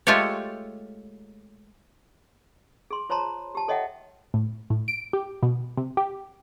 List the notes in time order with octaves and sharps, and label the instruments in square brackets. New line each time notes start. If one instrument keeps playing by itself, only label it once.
[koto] G#3 A3 F4 G4 A4 C#5
[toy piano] G#4 C6
F4 C5 C#5 A5 A#5 C6
G4 A5
A4 C#5 D#5 E5 F#5 G5
[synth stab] A2
A2
D7
G4
B2
C3
G4